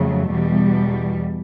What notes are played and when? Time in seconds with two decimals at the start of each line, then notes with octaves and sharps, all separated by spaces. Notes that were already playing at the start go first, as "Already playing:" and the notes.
Already playing: F2 C#3 F#3 A3
0.30 E2 B2 G3